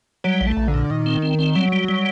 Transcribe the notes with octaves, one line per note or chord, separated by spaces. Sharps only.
F#3 G3
A#1
A3
A#1
D3
A#2
A#2 D#3
C4
C4
C4
F#3 G3
G3
G3